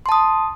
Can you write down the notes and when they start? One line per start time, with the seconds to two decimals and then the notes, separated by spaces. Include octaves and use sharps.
0.06 C6
0.09 A5
0.12 D#6